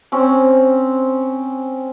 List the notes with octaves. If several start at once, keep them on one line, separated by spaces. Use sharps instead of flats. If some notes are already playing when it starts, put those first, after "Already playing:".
C4 C#4